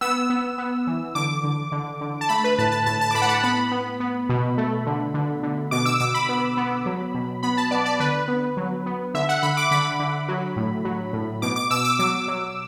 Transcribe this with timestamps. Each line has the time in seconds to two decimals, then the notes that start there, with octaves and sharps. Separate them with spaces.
0.01 B3 E6
0.30 B3
0.58 B3
0.87 E3
1.15 D3 D6
1.44 D3
1.72 D3
2.01 D3
2.21 A5
2.29 A3 B5
2.44 B4
2.59 A2 A5
2.72 A5
2.86 A2 A5
3.01 A5
3.11 D6
3.15 A2 B5
3.22 F#5
3.29 A5
3.43 B3 B5
3.72 B3
4.00 B3
4.29 B2
4.58 A3
4.86 D3
5.14 D3
5.43 D3
5.71 B2 D6
5.86 E6
6.00 B2 D6
6.14 B5
6.29 B3
6.57 B3
6.86 F#3
7.14 B2
7.43 B3 B5
7.57 A5
7.71 B3 D5
7.86 D5
8.00 D3 B4
8.28 B3
8.57 F#3
8.86 B3
9.14 D3 E5
9.29 F#5
9.42 D3 B5
9.57 D6
9.71 D3 B5
9.99 D3
10.28 F#3
10.56 A2
10.85 F#3
11.13 A2
11.42 B2 D6
11.56 D6
11.71 B2 E6
11.85 D6
11.99 F#3 D6
12.28 F#3